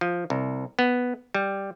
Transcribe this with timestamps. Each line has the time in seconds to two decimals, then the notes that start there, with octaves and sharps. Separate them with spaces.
0.01 F3
0.30 C2
0.79 B3
1.35 G3